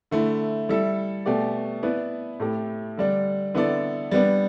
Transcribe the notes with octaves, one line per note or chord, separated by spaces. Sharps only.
D3 A3 E4
G3 E4 A4 E5
B2 A3 G4 D5
B3 E4 B4 D5
A2 A3 E4 G4
D3 G3 D4
D3 B3 E4 A4 D5
G3 B3 D4